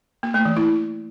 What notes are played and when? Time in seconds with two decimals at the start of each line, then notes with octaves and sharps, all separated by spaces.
0.23 A#3
0.34 A3
0.45 E3
0.57 E4